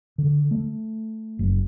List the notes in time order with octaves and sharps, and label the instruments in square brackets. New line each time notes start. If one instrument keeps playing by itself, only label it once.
[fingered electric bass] D3
A3
F#1